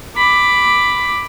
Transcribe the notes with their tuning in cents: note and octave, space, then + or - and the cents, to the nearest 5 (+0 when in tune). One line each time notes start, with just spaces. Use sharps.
B5 +5 D6 +5